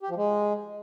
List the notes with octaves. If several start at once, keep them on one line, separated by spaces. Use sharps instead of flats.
G4
F3
G#3